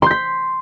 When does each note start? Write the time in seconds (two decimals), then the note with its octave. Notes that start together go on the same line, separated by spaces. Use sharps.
0.02 C6
0.06 G6
0.11 B6